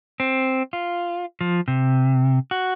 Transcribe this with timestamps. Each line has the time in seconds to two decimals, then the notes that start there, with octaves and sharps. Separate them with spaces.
0.20 C4
0.73 F4
1.41 F3
1.68 C3
2.51 F#4